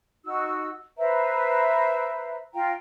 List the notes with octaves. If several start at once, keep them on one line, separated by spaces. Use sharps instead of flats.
D#4 F#4 E6
B4 C5 E5 A#5
F4 F5 G5 A#5